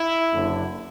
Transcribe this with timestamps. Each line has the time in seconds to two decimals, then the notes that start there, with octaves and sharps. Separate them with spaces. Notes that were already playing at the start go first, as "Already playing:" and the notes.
Already playing: E4
0.32 F#1 F#2 D3